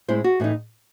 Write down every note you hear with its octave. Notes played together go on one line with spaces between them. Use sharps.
A2 G#3 C4 E4 C5
F#4
A2 E3 A3 D#4